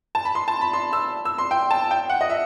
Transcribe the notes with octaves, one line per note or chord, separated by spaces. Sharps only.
A5
B5
C6
A5
B5
C6
E6
E6
C6
G5
A5
G5
F#5
D#5
E5